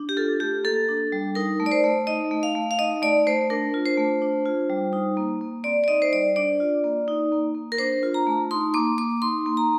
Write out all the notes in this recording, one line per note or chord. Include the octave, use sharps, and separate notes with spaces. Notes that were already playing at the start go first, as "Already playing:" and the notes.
Already playing: D4
G4
F4 A4
A3 G4
A#3 A4
D4
G3
D#4 A#4
A3
D5
C5
A3
D#4 D#5
A3
F5
A3
F5
D#4 D#5
A3 D5
A3 C5
D4 A#4
F4
C5
A3
D4
F4
G3
D#4
A#3
A#3
C4 D5
D5
D#4 D#5
C5
G3 D5
D4 D5
F4
A#3
D#4
A#3
A#3
A#4
D4 C5
F4
A#5
A3
D#4 C6
A#3 D6
A#3 D6
D#4 C6
A#3
A#5